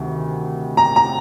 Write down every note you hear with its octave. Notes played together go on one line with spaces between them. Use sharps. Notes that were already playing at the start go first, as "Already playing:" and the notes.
Already playing: D2 C3 D#3
A#5
A#5